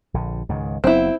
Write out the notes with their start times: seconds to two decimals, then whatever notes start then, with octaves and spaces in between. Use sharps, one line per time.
0.14 A#1 D3
0.49 C#2 G#2 D#3
0.84 F#1 F#3 B3 C4 E4